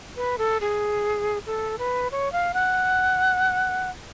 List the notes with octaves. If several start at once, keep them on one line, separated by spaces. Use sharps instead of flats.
B4
A4
G#4
A4
B4
C#5
F5
F#5